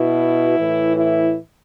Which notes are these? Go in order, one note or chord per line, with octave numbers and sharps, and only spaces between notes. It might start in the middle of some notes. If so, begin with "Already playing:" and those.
Already playing: B2 E4
A2 E3
E4